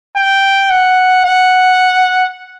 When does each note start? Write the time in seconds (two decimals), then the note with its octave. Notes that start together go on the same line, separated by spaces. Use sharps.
0.16 G5
0.70 F#5
1.25 F#5